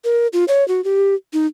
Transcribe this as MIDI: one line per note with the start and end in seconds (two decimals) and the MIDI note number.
0.04 0.27 70
0.33 0.44 65
0.48 0.66 73
0.68 0.83 66
0.84 1.14 67
1.33 1.46 63